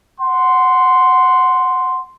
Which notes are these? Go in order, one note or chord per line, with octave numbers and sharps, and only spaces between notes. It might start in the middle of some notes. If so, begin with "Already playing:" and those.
F#5 C6